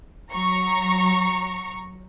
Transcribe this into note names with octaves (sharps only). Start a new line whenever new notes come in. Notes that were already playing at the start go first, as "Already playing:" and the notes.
F#3 A#5 C#6